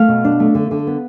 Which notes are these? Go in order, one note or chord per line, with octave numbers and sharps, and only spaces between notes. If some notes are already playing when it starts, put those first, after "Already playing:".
Already playing: A3 F5
B2
D4
A3
D3
D3
B3